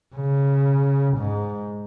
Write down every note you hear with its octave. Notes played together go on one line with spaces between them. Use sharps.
C#3
G#2